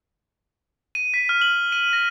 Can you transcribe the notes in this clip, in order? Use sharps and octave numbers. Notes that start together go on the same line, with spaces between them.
D#7
B6
F6
F#7
D#7
A#6